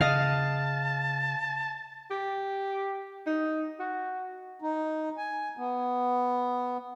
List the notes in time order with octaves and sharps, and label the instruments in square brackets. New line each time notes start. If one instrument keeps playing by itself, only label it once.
[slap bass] C#3 [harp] D#5 F5 [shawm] A5
[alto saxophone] G4
D#4
F#4
[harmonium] D#4
G#5
B3